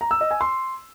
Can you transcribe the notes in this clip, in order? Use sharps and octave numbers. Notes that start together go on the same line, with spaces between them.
A#5
E6
D#5
G#5
C6